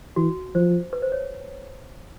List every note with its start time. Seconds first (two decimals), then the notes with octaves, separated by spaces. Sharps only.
0.16 E3 F#4
0.54 F3 C5
0.93 B4
1.02 C5
1.12 C#5